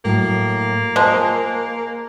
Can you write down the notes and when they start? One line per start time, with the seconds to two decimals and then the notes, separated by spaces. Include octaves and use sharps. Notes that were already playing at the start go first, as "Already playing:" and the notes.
0.05 A2 F#3 A#3
0.96 F3 G#3 C5 A5